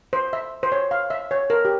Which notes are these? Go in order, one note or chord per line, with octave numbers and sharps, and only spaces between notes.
C5
E5
C5
C#5
F5
E5
C#5
A#4
G4